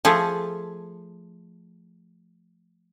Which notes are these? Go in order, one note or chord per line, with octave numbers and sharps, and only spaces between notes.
F3 A3 G#4